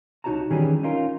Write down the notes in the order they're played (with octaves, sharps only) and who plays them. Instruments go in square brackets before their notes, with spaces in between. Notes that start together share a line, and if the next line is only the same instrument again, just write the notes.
[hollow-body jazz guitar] C2 D#4 F#4 C#5 A5 A#5
D#3 E3 G3 C#4 G4 G#4
C#4 D#4 F4 A#4